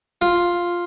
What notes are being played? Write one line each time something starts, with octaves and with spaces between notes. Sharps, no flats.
F4